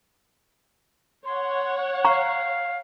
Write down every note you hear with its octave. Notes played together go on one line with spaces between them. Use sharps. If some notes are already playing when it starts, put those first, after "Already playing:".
C#5 F#5 C6
F5 A#5 C#6